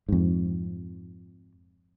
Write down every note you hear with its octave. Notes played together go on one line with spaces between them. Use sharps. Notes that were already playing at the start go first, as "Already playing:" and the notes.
F2 G#2